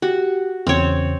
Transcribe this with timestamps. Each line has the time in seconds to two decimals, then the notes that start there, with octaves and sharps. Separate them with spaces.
0.02 F#4 G4
0.67 E2 C#3 C4 C#5